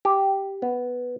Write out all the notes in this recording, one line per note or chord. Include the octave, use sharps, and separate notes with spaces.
G4
B3